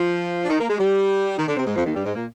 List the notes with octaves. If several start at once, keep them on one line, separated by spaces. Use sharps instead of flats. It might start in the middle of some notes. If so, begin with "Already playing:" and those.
Already playing: F3 F4
D4
D#3 D#4
A#3 A#4
G#3 G#4
G3 G4
D#3 D#4
D3 D4
C3 C4
G#2 G#3
F2 F3
D#2 D#3
G2 G3
G#2 G#3
A#2 A#3